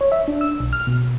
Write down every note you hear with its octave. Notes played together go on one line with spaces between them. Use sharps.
C#5
E5
D4
E6
B1
F6
B2